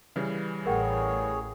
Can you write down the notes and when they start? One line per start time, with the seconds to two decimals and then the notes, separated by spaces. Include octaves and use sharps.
0.16 C#3 E3 G3 B4
0.66 A1 G#4 A#4 C#5 F#5 G5